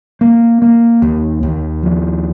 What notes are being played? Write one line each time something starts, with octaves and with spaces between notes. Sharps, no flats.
A#3
A#3
D#2
D#2
F3